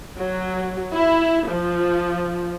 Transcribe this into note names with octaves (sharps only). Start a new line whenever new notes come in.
F#3
E4
F3